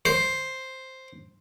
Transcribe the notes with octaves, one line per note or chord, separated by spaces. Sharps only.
C5